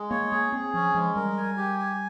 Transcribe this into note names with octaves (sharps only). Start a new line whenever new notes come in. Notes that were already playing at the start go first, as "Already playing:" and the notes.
Already playing: G#3
A#3 C#5
A#3 G#4
C4 G#4
F3 C#4
F3 G#3
G3 A#4
G#5
G4
G#5